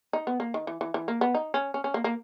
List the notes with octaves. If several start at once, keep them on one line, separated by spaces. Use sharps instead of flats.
D#4
B3
A#3
D#3
E3
E3
E3
A#3
B3
D#4
C#4
C#4
C#4
A#3
A#3